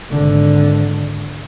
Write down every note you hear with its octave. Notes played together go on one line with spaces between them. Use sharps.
G#1 D3